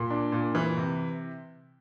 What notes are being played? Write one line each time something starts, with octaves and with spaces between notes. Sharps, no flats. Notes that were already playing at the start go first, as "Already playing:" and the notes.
Already playing: A#2
D4
A#2
E3
C3